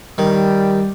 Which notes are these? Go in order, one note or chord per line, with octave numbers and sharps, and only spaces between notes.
D#3 G3